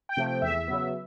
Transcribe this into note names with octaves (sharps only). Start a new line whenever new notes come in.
G5
C3 F3 A3
G5
E2 E5
C#3 F#3 B3